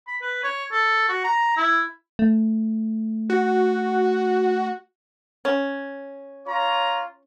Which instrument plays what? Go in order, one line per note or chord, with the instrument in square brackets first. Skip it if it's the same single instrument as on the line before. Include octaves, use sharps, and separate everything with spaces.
[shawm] B5
B4
C#5
A4
F#4
A#5
E4
[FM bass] A3
[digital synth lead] F#4
[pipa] C#4
[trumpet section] F4 C#5 A#5